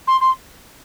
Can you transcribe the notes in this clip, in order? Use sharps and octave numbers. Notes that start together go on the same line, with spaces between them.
C6
C6